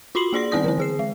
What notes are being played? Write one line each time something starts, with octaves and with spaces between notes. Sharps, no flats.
F4 F#4 B5 C6 C7 F#7
A#3 G#4 D5 C6 A#6
D#3 B3 C4 D5 D#6 A#6
D3 E3 C4
D3 G#4 C7
G#3